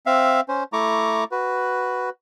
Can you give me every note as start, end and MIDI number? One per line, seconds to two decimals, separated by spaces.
0.06 0.41 60
0.06 0.41 76
0.06 0.41 77
0.48 0.64 61
0.48 0.64 72
0.73 1.24 57
0.73 1.24 64
0.73 1.24 82
0.73 1.24 85
0.73 1.24 86
1.31 2.10 66
1.31 2.10 71